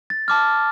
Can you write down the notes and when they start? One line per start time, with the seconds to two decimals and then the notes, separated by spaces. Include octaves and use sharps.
0.10 A6
0.28 A5 D6 F6